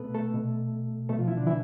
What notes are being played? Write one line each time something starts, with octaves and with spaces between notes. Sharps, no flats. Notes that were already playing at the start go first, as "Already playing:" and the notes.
Already playing: B2 A3 B3 A4 B4
A3 A4
B2
B2 A3 A4
F3 F4
E3 E4
D3 D4
E3 E4